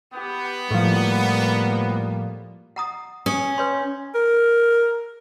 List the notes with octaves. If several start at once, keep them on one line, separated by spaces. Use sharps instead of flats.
B3 G4
A2 F3 G3 A#3
F#5 A#5 D#6
C#4 D#6
B4 C#5 C6
A#4